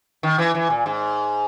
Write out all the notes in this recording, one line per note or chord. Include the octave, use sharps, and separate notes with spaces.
D#3
E3
E3
A#2
G#2